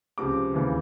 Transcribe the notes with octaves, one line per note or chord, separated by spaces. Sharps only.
C#2 C3 F3 D6
D#2 C#3 E3